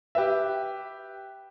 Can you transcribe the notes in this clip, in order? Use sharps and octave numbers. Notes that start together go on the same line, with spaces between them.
G4 B4 E5